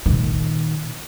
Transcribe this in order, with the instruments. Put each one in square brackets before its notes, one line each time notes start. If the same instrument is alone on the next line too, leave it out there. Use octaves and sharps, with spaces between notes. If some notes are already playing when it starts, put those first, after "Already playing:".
[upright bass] A#2 D#3